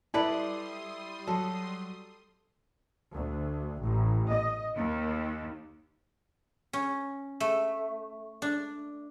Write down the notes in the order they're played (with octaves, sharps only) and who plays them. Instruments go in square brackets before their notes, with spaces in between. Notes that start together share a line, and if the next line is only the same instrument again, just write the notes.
[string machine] G3 C6 D#6 [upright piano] E4 [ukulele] A4 B4 D5
[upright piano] F#3 [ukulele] A4
[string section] D2
A1
D#5
D#2
[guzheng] C#4
A3
D4